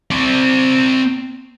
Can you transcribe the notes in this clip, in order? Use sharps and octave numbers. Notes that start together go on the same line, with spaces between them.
C4 D5